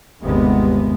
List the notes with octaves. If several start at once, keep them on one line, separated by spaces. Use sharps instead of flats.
G1 D#2 C3 G#3 B3